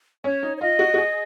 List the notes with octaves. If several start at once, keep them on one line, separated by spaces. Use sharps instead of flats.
C#4 C#5
D#4
C#5
F4 D#5
F#4
F#4
G#4